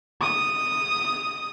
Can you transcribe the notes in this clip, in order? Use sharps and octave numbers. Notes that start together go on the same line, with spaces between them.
D#6